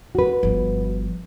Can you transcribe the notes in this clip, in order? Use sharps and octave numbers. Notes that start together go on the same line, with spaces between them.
F#4 B4
G1 F3